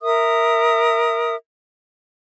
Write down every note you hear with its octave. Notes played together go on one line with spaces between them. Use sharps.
A#4 E5 D#6